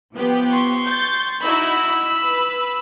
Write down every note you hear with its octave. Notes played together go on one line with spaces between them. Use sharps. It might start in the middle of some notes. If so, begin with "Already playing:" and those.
F3 B3 G4
C6 C#6
G6 A6
D#4 E4 F#4 B5 E6
B4